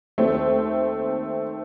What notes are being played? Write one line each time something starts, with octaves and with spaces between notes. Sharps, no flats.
D#2 D#3 A3 C4